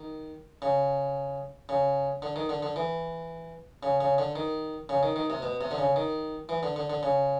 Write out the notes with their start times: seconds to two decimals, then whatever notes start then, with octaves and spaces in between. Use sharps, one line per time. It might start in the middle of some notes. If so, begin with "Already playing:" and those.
Already playing: D#3
0.62 C#3
1.69 C#3
2.22 D3
2.36 D#3
2.49 D3
2.62 D3
2.76 E3
3.83 C#3
4.01 C#3
4.18 D3
4.36 D#3
4.89 C#3
5.03 D#3
5.16 D#3
5.30 C3
5.42 B2
5.61 C3
5.71 D3
5.78 C#3
5.96 D#3
6.49 E3
6.63 D3
6.76 D3
6.90 D3
7.03 C#3